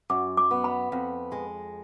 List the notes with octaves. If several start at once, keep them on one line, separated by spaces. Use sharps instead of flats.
F#2 D6
D6
B3
B5
F2
G#3